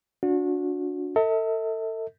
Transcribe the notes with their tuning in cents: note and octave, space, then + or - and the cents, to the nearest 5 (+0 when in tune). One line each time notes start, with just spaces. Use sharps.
D4 -25 F#4 -30
A4 +35 E5 -45